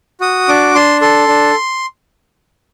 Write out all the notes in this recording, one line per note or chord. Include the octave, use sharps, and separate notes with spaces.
F#4 D#6
D4 D6
D4 C6
A4 C6
D4